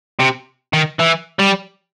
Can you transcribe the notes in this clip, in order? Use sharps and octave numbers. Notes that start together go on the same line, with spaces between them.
C3
D#3
E3
G3